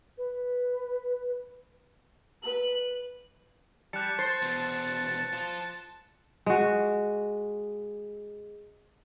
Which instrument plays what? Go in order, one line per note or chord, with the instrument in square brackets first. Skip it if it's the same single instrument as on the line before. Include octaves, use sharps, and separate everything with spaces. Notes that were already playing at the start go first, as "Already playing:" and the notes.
[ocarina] B4
[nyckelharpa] B4 [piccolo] F#7
[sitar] G3 [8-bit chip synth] A5 [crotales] F#6 C#7
[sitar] C5 [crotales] A6
[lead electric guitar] E2 B2
F4 C5
[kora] G#3 F#4